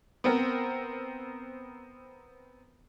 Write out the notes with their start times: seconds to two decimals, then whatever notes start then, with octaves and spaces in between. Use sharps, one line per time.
0.24 B3 C4 A#4